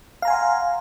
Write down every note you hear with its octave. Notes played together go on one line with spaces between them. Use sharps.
F5 F#5 G#5 A#5 C6